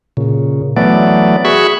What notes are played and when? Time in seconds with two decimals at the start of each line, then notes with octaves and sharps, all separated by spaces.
0.17 A#2 C#3
0.77 E3 F#3 A3 B3 D5
1.45 F#4 G#4 E5 B5 C#6